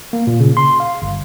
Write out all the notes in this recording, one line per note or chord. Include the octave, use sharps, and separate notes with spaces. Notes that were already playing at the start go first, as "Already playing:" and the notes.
A#3
A#2
C#3
C6
F5
G1